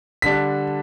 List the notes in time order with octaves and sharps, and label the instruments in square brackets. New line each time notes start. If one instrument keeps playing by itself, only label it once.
[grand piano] D3 G3 D4 B6